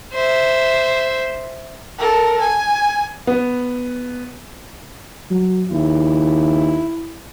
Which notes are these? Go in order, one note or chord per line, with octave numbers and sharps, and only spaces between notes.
C5 E5
A4 A#4
G#5
B3
F#3
D#2 E4